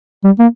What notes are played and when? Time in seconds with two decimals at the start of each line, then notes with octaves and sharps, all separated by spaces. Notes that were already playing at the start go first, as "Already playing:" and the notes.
0.24 G3
0.39 A#3